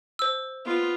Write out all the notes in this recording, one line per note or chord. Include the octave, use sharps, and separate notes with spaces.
C5 E6
B3 F4